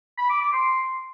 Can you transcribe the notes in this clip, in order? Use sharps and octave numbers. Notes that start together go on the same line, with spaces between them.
B5
D6
D6
C6